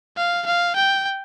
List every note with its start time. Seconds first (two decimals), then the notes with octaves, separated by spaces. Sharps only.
0.17 F5
0.46 F5
0.76 G5